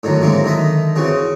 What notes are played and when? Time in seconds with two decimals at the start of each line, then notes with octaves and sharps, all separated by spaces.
0.03 A2 D3 D#3 F#3
0.21 F#3 G#3 A#3 C4 E4
0.44 D3 D#3 D#5 E5
0.96 C#3 E3 C4 F#4
1.08 C#3